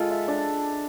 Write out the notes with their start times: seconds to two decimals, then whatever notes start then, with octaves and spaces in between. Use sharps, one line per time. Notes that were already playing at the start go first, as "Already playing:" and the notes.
Already playing: G#3 F4 A4
0.11 E5
0.28 D4